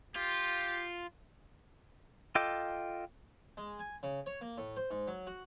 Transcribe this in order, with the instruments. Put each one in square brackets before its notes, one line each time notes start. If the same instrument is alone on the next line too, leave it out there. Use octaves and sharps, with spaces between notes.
[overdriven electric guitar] F4 [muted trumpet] G4
[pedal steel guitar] F4 A4 D#5 G5 D6
[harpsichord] G#3
G#5
C#3
C#5
A#3
A2
C5
G#2
F#3
F#4